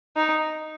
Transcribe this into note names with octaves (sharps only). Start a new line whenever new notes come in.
D#4